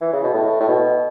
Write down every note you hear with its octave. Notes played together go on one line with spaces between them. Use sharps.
E3
C#3
B2
A2
A2
B2